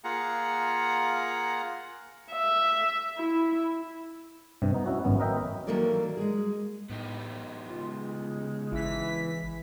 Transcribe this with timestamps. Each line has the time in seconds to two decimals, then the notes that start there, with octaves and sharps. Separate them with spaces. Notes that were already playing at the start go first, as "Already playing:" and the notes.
0.04 A#3 F4 G#4 F#5 A#5
2.32 E5
3.18 E4
4.62 G2 C3
4.74 B3 D#4
4.86 C#4 E4 F#4
5.04 G#1 F#2 B3 C#4
5.20 A#4 B4 D#5 E5 G5 A#5
5.67 D#3 E3 F#3 A#3 A4 D5
6.17 G#3 G#4
6.90 A2 B3 D#4 G4
7.70 C#3 G#3 F4
8.72 G#1 E3 B6